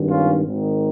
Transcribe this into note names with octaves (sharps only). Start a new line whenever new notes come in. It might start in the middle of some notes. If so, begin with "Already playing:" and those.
Already playing: G#1 G2 D#3
C#4 F4
G#1 G#2 D#3